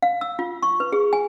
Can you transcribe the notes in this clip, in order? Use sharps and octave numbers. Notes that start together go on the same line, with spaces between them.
F5
E6
F4
C#6
B4
G#4
G#5